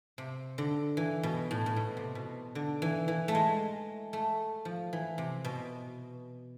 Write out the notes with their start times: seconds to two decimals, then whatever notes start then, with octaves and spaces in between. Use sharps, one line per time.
0.18 C3
0.58 D3
0.97 E3
1.23 B2
1.51 A2
1.66 A2
1.76 B2
1.97 C3
2.15 B2
2.55 D3
2.82 E3
3.08 E3
3.28 A3
3.35 G#3
4.13 A3
4.65 F3
4.93 E3
5.18 C3
5.45 B2